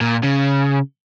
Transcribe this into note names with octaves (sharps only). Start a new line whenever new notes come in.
A#2
C#3